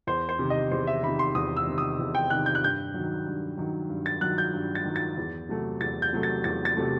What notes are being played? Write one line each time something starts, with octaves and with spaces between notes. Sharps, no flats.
E2 C5
C5
C3 D#3
D#5
E2 C5
E5
C3 D#3 B5
C6
E2 D#6
E6
C3 D#3
D#6
E2
G5
C3 D#3 F#6
G6
F#6
G2 G6
F#3
D#3
G2
D#3 F#3
G2
A6
D#3 F#3 F#6
G6
G2
A6
D#3 F#3
A6
E2
C3 F#3 A3
E2 A6
G6
C3 F#3 A3
A6
E2 A6
A6
C3 F#3 A3